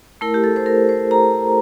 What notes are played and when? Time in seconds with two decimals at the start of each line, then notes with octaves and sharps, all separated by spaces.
0.21 A3 E4 A#4
0.34 G4
0.44 A4
0.56 C5
0.66 A#4
0.89 C5
1.11 A#5